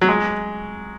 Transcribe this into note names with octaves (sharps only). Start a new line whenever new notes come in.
F#3
G#3